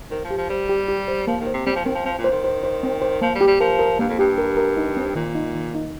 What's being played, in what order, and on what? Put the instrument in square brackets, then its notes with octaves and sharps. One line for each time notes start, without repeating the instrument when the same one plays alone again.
[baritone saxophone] D#3 [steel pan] C5
[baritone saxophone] F3
[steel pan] G4
[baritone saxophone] F3
[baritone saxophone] G3 [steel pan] C5
[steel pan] G4
G4
C5
[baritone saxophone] F3 [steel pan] A#3
[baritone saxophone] D#3
[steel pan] C5
[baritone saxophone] C3
[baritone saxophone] G3 [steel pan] C4
[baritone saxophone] F3
[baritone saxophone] D#3 [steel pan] C4
[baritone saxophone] F3
[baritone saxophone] F3 [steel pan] C4
[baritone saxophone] A#2
[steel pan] C5
[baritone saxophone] D#3
[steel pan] C5
C5
C4
C5
[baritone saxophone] F3 [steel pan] A#3
[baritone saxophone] G3
[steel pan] G4
[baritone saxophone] G3
[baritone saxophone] F3 [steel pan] A#4
[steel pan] A#4
[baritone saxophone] G2 [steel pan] A#3
[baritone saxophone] F2
[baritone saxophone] G2 [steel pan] G4
[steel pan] A#4
A#4
D#4
C4
[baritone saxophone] A#2 [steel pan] D#3
[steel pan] D#4
D#3
D#4